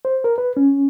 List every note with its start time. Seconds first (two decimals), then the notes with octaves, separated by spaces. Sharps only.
0.05 C5
0.24 A#4
0.38 B4
0.57 C#4